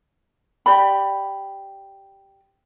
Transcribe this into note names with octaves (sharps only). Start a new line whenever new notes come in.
G4 D5 B5